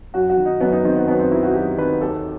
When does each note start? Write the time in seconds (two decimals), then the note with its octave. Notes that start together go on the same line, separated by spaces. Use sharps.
0.14 F#2 F#4
0.30 F#4
0.37 D#3
0.45 D#4
0.60 F#2 B3
0.72 D#4
0.85 D#3 C4
0.96 B3
1.07 F#2 B3
1.19 C4
1.31 D#3 E4
1.43 F#4
1.54 F#2 G4
1.78 D#3 B4
2.01 D#2 A4